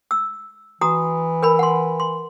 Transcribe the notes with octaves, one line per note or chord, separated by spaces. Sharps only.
E6
E3 F#4 A#5 D#6
A#4 B4 B5
F#5 C6
C6